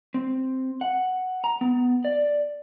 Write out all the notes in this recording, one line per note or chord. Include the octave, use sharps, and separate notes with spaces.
C4
F#5
A#5
B3
D5